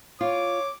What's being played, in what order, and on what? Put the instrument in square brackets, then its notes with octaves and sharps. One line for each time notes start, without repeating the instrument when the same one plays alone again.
[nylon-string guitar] F4 [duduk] C#5 [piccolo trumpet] D6